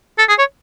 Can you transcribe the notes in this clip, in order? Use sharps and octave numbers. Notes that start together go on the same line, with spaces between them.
A4
G#4
C#5